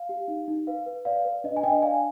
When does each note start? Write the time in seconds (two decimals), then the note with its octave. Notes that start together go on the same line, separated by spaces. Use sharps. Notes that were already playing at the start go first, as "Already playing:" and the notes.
Already playing: F5
0.09 G4
0.28 D#4
0.48 D#4
0.67 B4 F5
0.86 B4
1.05 D5 F5
1.25 B4
1.44 D4 D#5
1.57 G#5
1.63 D4 D#5 G5
1.82 D5 F5 G#5